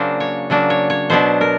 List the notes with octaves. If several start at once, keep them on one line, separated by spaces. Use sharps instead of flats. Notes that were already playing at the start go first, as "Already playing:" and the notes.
Already playing: C#3 F#3 A#3 D4 C5
C#5
C#3 F#3 A#3 D4
C#5
C#5
B2 F#3 B3 D4 C5
A#4